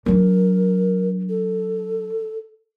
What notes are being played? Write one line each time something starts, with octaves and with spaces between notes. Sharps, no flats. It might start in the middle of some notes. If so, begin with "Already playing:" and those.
F#3 D4 A#4
A4